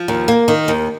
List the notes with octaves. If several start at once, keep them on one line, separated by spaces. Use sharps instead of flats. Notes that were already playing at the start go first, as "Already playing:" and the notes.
Already playing: F3
D#2
A#3
D#3
D#2